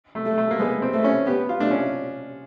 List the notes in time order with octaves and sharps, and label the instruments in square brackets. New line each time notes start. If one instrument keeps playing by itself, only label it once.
[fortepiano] A3
[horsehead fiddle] A3
[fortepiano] A3
A#3
[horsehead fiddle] G#3 [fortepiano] B3
[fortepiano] C4
[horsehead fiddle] A3
[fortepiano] C#4
[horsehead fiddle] B3 [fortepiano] G4
[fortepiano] F4
[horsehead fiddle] A3 [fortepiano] D4
[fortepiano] C#4